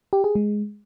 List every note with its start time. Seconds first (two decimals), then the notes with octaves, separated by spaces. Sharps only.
0.13 G4
0.24 G#4
0.35 G#3